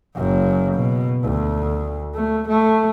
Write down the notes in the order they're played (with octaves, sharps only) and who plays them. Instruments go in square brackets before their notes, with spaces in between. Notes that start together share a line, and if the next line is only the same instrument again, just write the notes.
[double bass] F#1 F#2
B2
D2
A3
A3